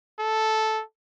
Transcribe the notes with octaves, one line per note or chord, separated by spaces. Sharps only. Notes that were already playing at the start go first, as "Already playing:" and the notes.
A4